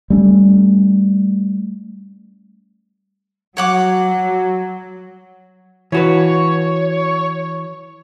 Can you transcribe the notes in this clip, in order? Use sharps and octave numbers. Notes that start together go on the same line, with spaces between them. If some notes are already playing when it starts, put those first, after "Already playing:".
G3 A3 C#4
F#3 C#5 F#5 D6
E3 F#4 B4 C#5